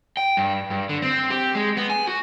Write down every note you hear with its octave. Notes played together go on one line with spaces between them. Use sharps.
G5
G2
G2
D3
C4
G4
G#3
B3
G#5
F#4